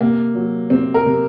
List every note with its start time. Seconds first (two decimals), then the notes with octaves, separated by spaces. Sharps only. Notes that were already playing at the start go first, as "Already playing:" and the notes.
0.01 C3 A#3
0.35 F#3
0.70 C3 C4
0.94 A#4
1.06 C3